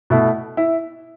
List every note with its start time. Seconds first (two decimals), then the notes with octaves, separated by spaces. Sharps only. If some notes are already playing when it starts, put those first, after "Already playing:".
0.10 B2 A3 E4
0.57 E4